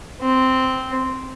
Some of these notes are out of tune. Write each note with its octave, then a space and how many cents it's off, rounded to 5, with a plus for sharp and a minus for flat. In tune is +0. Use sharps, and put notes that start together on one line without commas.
C4 -10